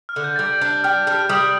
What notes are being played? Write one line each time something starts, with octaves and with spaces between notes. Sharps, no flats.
F6
D3
G6
G3 A6
G6
D4
G4 F6
G3 F6
G3 D#6